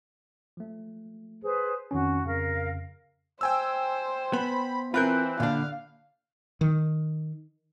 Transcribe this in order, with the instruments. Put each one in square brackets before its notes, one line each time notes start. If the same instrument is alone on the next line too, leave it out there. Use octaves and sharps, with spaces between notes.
[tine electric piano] F3 A3
[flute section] G#4 B4 C5
[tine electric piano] F2 D#3 C#4 [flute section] F#4
[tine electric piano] F2 C#3 [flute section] A#4 F5
[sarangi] C5 [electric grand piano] G5 G#5 E6
[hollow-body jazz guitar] B3 [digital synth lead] B5
[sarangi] E3 [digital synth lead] C4 [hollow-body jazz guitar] F4 A#4 [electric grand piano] B5 F#6 G6
[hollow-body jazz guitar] A#2 D4 [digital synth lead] D3 [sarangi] F5
[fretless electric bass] D#3